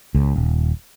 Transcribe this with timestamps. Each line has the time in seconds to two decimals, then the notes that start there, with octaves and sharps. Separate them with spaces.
0.15 C#2
0.36 D#1